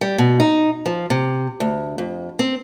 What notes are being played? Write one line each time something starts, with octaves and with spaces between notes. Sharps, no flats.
G3
B2
D#4
F3
C3
D2
F2
C4